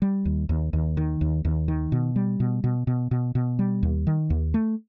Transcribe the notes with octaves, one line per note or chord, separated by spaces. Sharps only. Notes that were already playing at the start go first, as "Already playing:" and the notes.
G3
D#2
D#2
D#2
D#3
D#2
D#2
D#3
B2
G3
B2
B2
B2
B2
B2
G3
D#2
D#3
D#2
A3